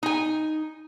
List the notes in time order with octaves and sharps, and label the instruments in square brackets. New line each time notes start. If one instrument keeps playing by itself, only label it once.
[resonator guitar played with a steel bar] D#4 G#5